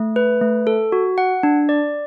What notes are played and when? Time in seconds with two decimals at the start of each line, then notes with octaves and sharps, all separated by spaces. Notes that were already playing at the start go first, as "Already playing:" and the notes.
Already playing: A3
0.16 B4
0.41 A3
0.67 A4
0.92 F#4
1.18 F#5
1.43 D4
1.69 D5